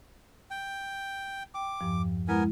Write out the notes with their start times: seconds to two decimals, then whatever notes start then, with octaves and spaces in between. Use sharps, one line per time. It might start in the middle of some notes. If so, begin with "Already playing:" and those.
0.51 G5
1.54 G5 D6
1.81 E2 G2 F3
2.28 G#3 B3 E4 A#4 G#5